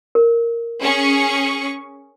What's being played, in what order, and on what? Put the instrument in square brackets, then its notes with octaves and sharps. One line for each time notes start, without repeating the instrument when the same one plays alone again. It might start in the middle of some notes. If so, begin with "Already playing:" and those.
[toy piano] A#4
[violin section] C#4 G#4 C#6